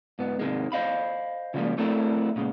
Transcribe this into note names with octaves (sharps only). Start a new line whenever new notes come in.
G#2 B3
G#2 C3 D#3 G#3
C5 D#5 F5 B5
C#3 E3 F3 G3 G#3 A#3
A3 C4 D4 E4 A4 A#4
A#2 C#3 G#3